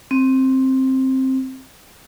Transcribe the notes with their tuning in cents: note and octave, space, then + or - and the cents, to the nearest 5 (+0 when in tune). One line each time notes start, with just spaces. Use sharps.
C4 +10